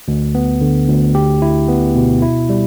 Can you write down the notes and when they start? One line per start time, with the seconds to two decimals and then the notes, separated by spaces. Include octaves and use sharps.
0.08 D2
0.35 B3
0.61 D3
0.88 D2
1.15 G4
1.42 E4
1.68 B3
1.95 B2
2.22 E4
2.49 G3